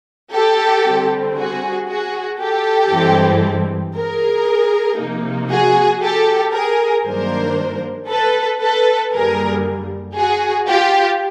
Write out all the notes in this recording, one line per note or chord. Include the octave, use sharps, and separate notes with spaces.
G4 A4
D3 G3 C4
F#4 G#4
F#4 G#4
G4 A4
G2 E3 G#3 C4
G#4 A#4
C3 F3 A#3 D#4
F#4 G#4
G4 A4
G#4 A#4
G2 D#3 F#3 A#3 D4 A#4 C5
A4 B4
A4 B4
F#2 D3 G3 A#3 G#4 A#4
F#4 G#4
F4 G4